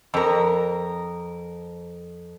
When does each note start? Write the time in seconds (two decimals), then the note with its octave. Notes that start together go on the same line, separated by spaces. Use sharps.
0.14 F2 A#4